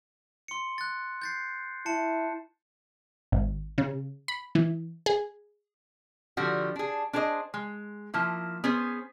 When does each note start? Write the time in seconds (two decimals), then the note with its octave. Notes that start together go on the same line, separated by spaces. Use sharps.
0.48 C6 C#7
0.78 F#6 A6
1.22 G6 A6 C7
1.86 E4 A5 C#7
3.32 G#1
3.78 C#3
4.28 B5
4.55 E3
5.06 G#4
6.37 D3 F3 G3 F#4
6.76 D4 G#4
7.13 D4 G#4 C5 C#5 D#5
7.54 G#3
8.14 F3 A#3 E4
8.64 B3 C#4 G#4 C5